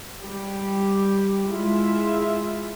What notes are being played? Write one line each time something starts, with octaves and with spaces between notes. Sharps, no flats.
G3 G4
G#3 E4 F4 E5